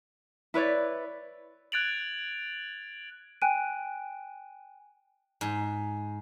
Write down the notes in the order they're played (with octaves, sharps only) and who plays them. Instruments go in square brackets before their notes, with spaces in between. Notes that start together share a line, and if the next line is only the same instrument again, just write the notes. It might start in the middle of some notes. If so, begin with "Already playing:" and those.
[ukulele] E4 B4 C#5 D5
[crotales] F#6 G#6 A6 D7 F7 F#7
[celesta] G5 G#5 F#6 D7 D#7
[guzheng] G#2